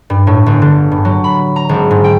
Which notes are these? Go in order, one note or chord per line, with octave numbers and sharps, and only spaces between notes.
G2
A2
G1
D3
G2
F#3
B5
A#5
G#1
G#2
G5